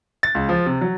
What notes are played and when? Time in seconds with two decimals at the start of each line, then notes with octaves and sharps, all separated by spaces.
0.23 A6
0.35 C#2
0.49 F3
0.66 C3
0.81 F#3